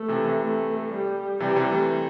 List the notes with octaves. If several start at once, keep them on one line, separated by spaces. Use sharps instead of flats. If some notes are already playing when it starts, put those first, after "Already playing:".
Already playing: A3
C3 E3
C3 E3
A3
G3
C3 E3 G3
C3 E3
E3 A3